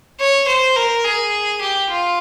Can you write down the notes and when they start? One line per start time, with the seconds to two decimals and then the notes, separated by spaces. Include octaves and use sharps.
0.20 C#5
0.47 C5
0.76 A#4
1.04 G#4
1.61 G4
1.90 F4